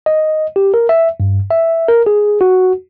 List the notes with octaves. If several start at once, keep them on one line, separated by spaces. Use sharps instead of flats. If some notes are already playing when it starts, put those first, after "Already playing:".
D#5
G4
A#4
E5
G2
E5
A#4
G#4
F#4